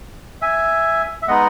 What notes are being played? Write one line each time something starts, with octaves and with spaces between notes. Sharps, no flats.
E5 G#5
E5
G#3 B3 D#4 D#5 F#5